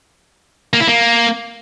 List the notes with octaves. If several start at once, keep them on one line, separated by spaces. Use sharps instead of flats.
A#3
E4
A#3